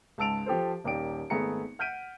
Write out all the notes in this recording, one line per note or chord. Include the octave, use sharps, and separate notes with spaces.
C#2 G#2 A5 E6 D7 F7
F3 G4 A4 C5
D#1 A#3 D#4 G4 D5 D7
G#1 A3 B3 G#4 A#5 C#7
F#5 F6 G6 B6 D7 D#7